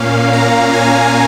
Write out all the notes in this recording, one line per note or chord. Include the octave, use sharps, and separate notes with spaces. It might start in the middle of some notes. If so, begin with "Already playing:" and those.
Already playing: A#2 A#3 C#4 F5
A#5
G#5